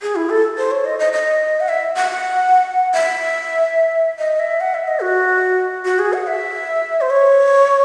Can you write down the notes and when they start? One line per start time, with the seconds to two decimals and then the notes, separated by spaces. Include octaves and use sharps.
0.02 G#4
0.16 E4
0.30 A4
0.58 C5
0.71 C#5
0.85 D#5
0.99 D#5
1.13 D#5
1.60 F#5
1.69 E5
1.96 F#5
2.94 E5
4.19 D#5
4.39 E5
4.61 F#5
4.74 E5
4.88 D#5
5.02 F#4
5.85 F#4
5.99 G#4
6.13 F#5
6.27 E5
7.01 C5
7.10 C#5